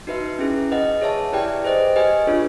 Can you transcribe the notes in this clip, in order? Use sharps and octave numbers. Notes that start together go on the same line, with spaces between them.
D#4 F#4 B4 E5
C#4 E4 G#4
G#4 B4 D#5 F#5
G#4 C#5 E5 A5
E4 G4 B4 D5 G5
G#4 C5 D#5
G4 B4 D#5 G#5
D4 F4 G#4 C#5